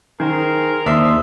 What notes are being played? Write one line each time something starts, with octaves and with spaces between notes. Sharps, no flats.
D#3 G#4 A#4 C5
D#2 D4 C5 D#5 E5